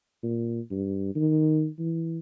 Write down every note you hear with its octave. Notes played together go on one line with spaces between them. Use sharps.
A#2
G2
D#3
E3